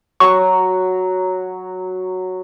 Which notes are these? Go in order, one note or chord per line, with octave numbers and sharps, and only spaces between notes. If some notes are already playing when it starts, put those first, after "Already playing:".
F#3 F#4 A#5 C#6